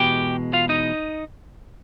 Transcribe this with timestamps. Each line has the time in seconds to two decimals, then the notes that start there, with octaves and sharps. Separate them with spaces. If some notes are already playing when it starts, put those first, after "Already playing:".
Already playing: E2 B2 G#3 G4 G5
0.53 F4 F5
0.69 D#4 D#5